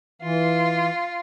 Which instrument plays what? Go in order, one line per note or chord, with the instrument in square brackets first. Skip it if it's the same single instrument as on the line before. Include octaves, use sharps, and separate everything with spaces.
[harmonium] E3 [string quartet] F4